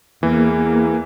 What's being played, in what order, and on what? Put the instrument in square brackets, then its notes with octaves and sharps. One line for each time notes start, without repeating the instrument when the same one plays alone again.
[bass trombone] E2 [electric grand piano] E3 [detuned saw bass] A#3